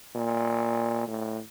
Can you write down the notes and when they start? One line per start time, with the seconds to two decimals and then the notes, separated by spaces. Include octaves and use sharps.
0.15 A#2
1.08 A2